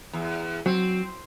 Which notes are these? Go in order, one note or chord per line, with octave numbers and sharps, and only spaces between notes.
E2
F#3 C4